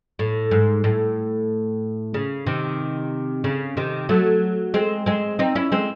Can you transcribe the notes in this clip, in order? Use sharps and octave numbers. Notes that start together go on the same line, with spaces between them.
A2
G#2
A2
C#3
C3 D#3
C#3
C3 D#3
F#3 A3
G#3 C4
G#3 C4
C4 D#4
C#4 E4
G#3 C4